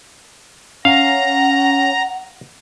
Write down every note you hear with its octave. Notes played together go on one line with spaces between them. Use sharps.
C#4 F5 F#5 A#5